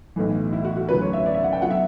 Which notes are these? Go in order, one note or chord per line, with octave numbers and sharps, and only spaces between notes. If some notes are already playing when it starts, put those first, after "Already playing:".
B1 A2 E3
E4
F#4
F#4
D2 C#3 F#3 C#4 B4
C#5
E5
D5
E5
F#5
G5
D3 F#3 B3 F#5
E5